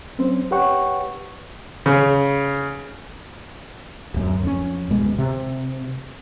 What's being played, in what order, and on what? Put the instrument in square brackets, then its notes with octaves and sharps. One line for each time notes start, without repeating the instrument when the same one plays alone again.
[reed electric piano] F#3 C4 C#4 C5
G4 B4 C#5 F#5 G5 C#6
[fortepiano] C#3
[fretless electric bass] D1 F#2
F2 C#4
D1 B2 G#3
C3